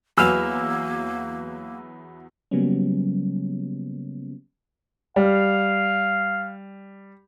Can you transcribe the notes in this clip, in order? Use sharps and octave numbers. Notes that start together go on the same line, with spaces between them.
E2 F#3 A#3 B4 G#5 E6 F6 F7
C#3 F#3 G3 A#3 B3 C#4
G3 F5